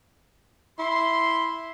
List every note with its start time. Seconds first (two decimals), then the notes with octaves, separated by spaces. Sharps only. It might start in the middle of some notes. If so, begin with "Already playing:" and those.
0.79 E4 C6